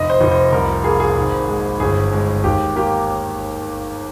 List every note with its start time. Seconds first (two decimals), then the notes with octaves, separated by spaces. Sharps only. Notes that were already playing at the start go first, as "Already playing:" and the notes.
Already playing: F1 D#5
0.10 C5
0.21 F1
0.31 C5
0.52 C2 A#4
0.84 A#3 G#4
1.00 G#4
1.16 G#1
1.49 G#3
1.80 G1 G#4
2.12 G#3
2.44 D#2 G4
2.76 A#3 G4